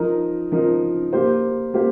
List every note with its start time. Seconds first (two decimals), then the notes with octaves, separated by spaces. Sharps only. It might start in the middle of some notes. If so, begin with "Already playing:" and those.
Already playing: F3 D#4 A#4
0.52 F3 D#4 A#4
1.13 A#3 G4 C5
1.74 A#3 G4 C5